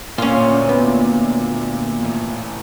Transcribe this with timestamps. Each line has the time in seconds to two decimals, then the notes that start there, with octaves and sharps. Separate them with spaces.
0.18 D2 A#2 C#4 F4 C6
0.69 B3
2.03 A2 E3